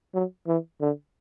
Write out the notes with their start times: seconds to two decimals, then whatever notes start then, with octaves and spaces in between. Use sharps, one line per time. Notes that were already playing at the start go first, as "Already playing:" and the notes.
0.14 F#3
0.48 E3
0.81 D3